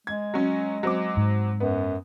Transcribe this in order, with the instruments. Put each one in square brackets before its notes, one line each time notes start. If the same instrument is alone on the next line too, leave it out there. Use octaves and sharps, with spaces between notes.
[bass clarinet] G#3 [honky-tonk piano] G#6
[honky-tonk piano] F#3 C#4
F#3 C4 D6
[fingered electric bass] G#2
[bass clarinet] F#2 [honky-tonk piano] B3